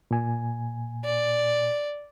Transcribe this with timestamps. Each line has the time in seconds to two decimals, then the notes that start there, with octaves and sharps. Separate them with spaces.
0.11 A#2 G#5
1.04 D5